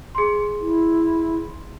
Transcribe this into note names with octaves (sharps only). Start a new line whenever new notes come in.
G#4 C6
E4